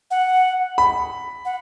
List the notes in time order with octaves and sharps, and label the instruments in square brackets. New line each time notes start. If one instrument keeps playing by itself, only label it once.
[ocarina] F#5
[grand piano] B5
[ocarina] F#5